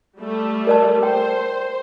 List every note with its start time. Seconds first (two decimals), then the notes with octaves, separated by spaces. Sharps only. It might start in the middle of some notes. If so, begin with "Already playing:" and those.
0.18 G3 A3
0.67 A#4 D5 A5
1.03 C5 G5